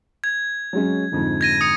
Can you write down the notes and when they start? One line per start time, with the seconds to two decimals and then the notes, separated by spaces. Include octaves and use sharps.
0.24 G#6
0.73 F#3 G#3 C#4
1.12 F2 G#2 D3
1.41 G#6 A#6 D#7
1.61 D#6 C#7